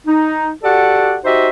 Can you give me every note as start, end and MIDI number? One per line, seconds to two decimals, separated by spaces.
0.07 0.49 63
0.64 1.15 66
0.64 1.15 67
0.64 1.15 69
0.64 1.15 74
0.64 1.15 78
1.24 1.49 63
1.24 1.49 66
1.24 1.49 67
1.24 1.49 72
1.24 1.49 75
1.24 1.49 76